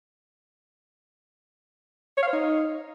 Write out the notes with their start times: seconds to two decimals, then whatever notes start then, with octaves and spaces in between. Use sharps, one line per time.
2.18 C#5
2.23 F5
2.28 C5
2.33 D#4